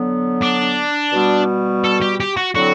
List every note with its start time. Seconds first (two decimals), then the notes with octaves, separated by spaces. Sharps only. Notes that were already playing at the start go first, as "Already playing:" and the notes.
Already playing: D3 F#3 B3
0.42 D4
1.13 B2 G3 B3 F#4
1.84 A4
2.01 G4
2.20 G4
2.37 F#4
2.55 D3 F#3 C4 E4 F#4 A4